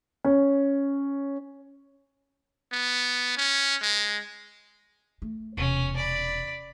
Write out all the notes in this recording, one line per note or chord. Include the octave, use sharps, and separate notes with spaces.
C#4
B3
C#4
G#3
A3
E1 C3 C#4
D5 B5